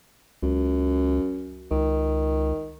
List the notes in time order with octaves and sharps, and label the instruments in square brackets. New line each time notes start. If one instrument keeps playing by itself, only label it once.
[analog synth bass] C#2 [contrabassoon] F#2
[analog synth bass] C#2 [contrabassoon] D#3